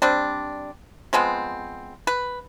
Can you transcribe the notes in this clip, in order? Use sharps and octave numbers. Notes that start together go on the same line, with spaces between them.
G3 C4 D4
F3 G#3 B3 C4
B4